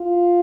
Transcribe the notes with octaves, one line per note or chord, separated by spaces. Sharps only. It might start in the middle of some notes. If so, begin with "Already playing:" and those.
Already playing: F4